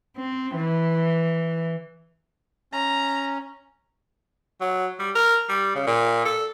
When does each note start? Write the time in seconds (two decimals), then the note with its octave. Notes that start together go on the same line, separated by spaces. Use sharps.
0.17 C4
0.56 E3
2.73 C#4 A#5
4.61 F#3
4.99 G3
5.15 A#4
5.49 G3
5.75 C#3
5.87 A#2
6.25 A4